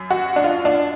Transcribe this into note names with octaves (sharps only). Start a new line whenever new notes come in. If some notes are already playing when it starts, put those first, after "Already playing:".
Already playing: F#2
F#4
D4
F4
D4